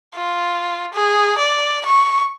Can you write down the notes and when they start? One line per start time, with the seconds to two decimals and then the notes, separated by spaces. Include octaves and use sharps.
0.16 F4
0.94 G#4
1.38 D5
1.86 C#6